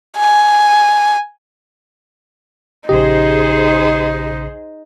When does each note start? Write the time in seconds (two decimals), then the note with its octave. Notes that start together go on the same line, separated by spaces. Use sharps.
0.17 G#5
2.89 A#1 C#3 D#4 G4 G#4 C5 D#5